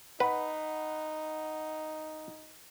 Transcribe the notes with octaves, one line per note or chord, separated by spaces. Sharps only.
D#4 B4 F#5 B5